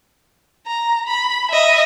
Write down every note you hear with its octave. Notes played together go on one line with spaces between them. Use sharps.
A#5
B5
D#5 E5